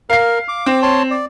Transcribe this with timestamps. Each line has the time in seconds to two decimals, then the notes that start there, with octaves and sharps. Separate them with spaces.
0.10 A#4 F5 C7
0.48 D6
0.66 C4
0.82 C#5 A5 C6
1.11 D5